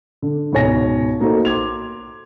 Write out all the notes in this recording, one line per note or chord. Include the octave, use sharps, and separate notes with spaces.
D3
C#2 G#2 B2 C#5 G#5 A#6
A#3 D#4 F#4 A4 C5
C6 D6 G#6 F7